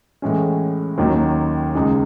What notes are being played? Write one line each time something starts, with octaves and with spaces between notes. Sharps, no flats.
A2 E3 G#3 C#4
D#2 D#3 F#3 C#4
C#2 C#3 G#3 D#4